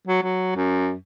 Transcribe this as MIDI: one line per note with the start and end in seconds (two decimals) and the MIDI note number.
0.07 0.22 54
0.23 0.55 54
0.56 0.94 42